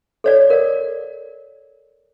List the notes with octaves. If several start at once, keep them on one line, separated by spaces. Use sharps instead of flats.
A4 C#5 D5
A#4 D5